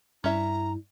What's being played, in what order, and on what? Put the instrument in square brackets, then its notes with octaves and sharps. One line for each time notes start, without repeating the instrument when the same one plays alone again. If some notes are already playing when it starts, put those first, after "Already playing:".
[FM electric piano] G2 [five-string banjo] C#4 E5 [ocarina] E4 [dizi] A#5